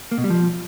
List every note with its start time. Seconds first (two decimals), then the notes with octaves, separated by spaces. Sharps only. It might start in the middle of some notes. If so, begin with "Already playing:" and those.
0.11 A#3
0.18 B2
0.24 G3
0.30 F3